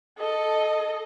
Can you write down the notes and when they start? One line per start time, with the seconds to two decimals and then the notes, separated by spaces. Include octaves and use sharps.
0.19 A4 D#5